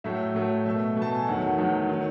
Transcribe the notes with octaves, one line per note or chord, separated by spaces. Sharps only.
A2 F#3 A3 E5
A2 F#3 A3
B2 A3 E5
B2 A3
A5
G#5
E2 D#3 F#3 A3 F#5
E2 D#3 F#3 A3
D#3 F#3